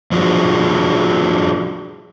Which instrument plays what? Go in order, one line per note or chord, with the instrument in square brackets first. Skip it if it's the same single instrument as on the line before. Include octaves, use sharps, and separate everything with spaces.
[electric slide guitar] F3 D4 F4 F#4 G#4